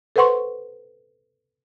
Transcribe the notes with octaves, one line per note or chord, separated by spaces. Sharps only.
A4 B4 C5 F#5 C6 C#6